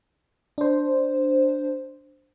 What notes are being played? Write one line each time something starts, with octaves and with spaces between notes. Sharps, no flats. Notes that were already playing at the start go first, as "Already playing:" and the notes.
D4 C5